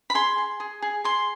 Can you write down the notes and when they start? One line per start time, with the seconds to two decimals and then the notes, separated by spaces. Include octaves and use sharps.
0.10 B5
0.15 G#4 C6
0.38 G#4
0.60 G#4
0.82 G#4
1.04 G#4 C6